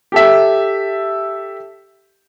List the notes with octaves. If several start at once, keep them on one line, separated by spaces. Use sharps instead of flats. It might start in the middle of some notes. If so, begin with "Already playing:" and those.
G4 A4 E5